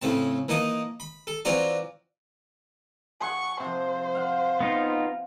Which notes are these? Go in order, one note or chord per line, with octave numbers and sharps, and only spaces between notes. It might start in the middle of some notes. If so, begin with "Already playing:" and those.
A2 C#3 C4 A5
E3 A#3 D#4 A5 D#6
B5
A4
E3 C4 F4 F#4 D5 A#5
G#4 F#5 C#6
C3 F3 C5
F5 F#5
B3 D#4 F4